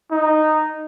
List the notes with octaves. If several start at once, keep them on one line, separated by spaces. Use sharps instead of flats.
D#4